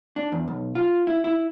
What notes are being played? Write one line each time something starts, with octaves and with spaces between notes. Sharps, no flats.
D4
E2
B1
F4
E4
E4